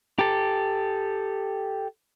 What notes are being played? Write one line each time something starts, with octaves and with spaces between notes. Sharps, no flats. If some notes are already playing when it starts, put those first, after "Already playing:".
G4 A4